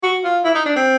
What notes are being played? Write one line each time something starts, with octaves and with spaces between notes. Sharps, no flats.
F#4
F4
E4
D#4
D4
C4